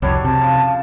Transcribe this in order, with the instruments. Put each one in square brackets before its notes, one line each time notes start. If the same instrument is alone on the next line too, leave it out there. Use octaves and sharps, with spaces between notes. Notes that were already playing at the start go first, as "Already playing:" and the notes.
[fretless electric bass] C2 F2 [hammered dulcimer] F#3 G3 D4 [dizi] C#5
[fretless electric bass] C3 [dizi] A5
[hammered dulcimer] C#3 F3